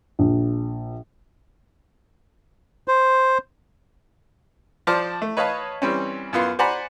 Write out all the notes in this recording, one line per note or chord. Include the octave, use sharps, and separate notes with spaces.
A#1
C5
F3 C5 D5 A5 F6
A3
B4 C#5 D#5 F5 A5 B5
E3 G3 C4 C#4
F#2 B3 F4 C6
C5 D5 F#5 G#5 A#5 B5